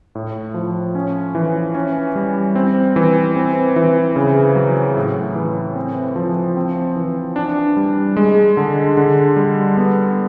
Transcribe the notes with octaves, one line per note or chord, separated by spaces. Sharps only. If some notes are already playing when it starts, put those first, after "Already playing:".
A2
F3
C#4
E3
C#4
G3
C4
E3
C4
E3
C#3
F#3
A2
E3
C4
F3
C4
E3
D4
G3
G#3
D3
D3
G3
B3